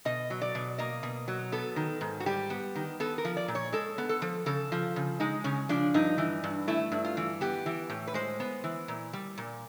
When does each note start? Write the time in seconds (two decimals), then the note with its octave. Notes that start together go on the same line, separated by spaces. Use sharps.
0.05 B2 D#5
0.30 F#3
0.42 D5
0.55 B2
0.78 A#3 D#5
1.03 B2
1.28 F#3
1.52 B3 A4
1.76 D#3
2.01 G#2
2.20 F#4
2.26 G3 G4
2.50 B3
2.75 D#3
3.00 B3 A4
3.18 A#4
3.25 F3
3.37 D5
3.48 A#2
3.55 C#5
3.73 G#3 A4
3.98 B3
4.09 A4
4.22 F3
4.46 C#3 A4
4.72 F3
4.96 C#3
5.20 G#3 D#4
5.44 C#3 C#4
5.69 F3 D4
5.94 G2 D#4
6.18 E3
6.44 G2
6.68 A3 E4
6.92 G2
7.05 F4
7.17 E3
7.41 B3 G4
7.66 E3
7.90 A2
8.07 B4
8.14 G#3 C5
8.40 B3
8.64 E3
8.88 A#2
9.13 G3
9.38 A#2